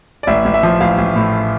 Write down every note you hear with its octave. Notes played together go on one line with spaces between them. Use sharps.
D5
A1 E5
A1
E5
F3
A1 F5
A1
A2